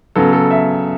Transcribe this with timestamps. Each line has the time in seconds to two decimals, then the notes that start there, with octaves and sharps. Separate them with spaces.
0.16 C#3 F#3 B3 A4
0.33 A4
0.51 E5